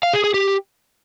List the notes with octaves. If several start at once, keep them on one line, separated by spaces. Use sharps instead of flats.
F5
G#4
G#4
G4